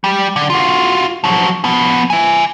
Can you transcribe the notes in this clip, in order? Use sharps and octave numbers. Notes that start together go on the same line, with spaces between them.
G3
D3
F4 F#4
F3 F#3
F3 B3
E5 G#5